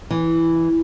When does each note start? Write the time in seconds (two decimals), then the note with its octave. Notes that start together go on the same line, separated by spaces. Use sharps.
0.11 E3